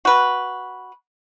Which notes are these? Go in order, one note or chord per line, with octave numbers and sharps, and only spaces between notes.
F#4 B4